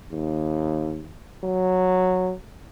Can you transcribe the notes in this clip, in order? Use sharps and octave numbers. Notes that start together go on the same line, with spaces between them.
D#2
F#3